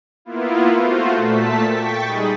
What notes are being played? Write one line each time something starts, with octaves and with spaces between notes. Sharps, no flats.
A#3 B3 E4 F4
A3 F4 F#4 C5
A#2 A3 A5 B6
G5 C#6 A6 B6
G3 G#3 D#4 G#4 B5 D#6